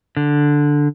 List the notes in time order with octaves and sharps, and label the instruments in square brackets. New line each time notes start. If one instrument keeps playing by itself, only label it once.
[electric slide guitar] D3